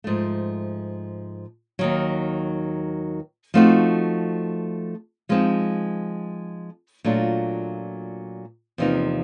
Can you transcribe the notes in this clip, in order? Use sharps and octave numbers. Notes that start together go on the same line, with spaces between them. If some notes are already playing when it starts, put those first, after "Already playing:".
G#2 F3 A3
D#2 D#3 F#3
F3 A3 C4 D#4 F#4
F3 G#3 C4 D#4
A#2 F#3 A3 D4 F4
E2 C3 F3 A#3 D#4